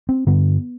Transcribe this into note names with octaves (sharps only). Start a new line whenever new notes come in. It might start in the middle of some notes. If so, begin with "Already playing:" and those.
C4
G2 D3 B3